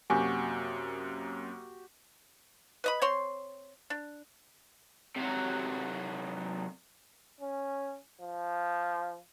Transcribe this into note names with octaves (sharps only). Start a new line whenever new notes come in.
F#2 C3 A#3 F#4 G4 G#5
B4 D#5 B5
C4 C#5 C6
D4
C3 F#3
C#4
F3